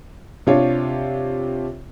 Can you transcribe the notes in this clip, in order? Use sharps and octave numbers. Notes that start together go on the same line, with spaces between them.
C3 D4 F4 C#5